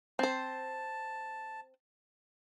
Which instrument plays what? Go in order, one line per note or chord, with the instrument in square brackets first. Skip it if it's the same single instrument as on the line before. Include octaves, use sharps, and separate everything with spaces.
[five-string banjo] C4 C5 [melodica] A5